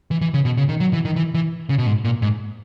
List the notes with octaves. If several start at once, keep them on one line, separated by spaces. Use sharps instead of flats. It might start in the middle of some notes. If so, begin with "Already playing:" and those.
E3
E3
C#3
B2
C#3
D#3
F#3
E3
D#3
E3
E3
C#3
B2
G#2
A#2
G#2